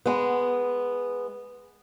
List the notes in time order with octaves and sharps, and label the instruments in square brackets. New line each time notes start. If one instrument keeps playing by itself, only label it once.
[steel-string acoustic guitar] G#3 B3